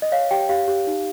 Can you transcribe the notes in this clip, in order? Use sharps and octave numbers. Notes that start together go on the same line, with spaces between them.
D#5
C#5 F5
G4 G5
G4 F5
G4
D#4